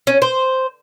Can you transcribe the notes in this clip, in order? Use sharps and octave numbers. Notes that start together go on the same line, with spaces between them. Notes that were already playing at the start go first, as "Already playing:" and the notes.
C#4
C5